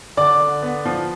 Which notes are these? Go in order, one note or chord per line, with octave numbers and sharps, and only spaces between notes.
D3 D5 D6
D3
B3
F3